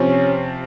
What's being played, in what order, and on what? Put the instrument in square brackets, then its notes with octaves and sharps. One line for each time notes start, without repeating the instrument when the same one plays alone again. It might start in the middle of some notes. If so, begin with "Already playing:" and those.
Already playing: [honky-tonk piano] C3 F3 C4 [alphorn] C#4